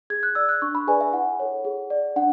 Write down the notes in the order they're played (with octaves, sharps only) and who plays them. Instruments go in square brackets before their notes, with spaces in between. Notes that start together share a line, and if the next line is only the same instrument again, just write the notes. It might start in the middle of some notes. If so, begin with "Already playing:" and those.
[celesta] G#4 G#6
F#6
D5 E6
F#6
D4 C#6
B5
G#4 B4 D5 G#5
E5
E4 F#5
A4 C#5
G#4
D5
D4 F#5